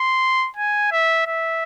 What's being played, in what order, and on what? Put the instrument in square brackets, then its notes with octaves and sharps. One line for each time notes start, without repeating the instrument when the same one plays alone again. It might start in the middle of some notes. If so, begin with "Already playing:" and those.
Already playing: [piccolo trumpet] C6
G#5
E5
E5